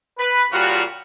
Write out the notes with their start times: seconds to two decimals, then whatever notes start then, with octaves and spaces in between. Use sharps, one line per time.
0.18 B4
0.51 A#2 C#3 G3 F4 F#4